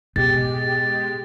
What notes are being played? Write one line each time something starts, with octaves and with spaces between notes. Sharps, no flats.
B2 G#3 G4 A6